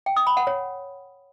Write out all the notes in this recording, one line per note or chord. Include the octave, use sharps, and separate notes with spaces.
G5
D#6
B5
F#5
C#5